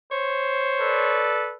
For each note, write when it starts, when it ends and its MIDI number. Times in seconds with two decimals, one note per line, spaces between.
0.11 1.30 72
0.11 1.36 73
0.80 1.55 69
0.80 1.55 71
0.80 1.55 74